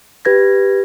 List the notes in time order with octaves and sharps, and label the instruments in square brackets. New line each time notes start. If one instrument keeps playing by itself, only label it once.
[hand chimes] G4 B4 G#6 A#6